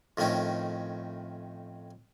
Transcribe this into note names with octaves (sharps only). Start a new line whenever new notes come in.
F2 A2 D#3 C#4 D#4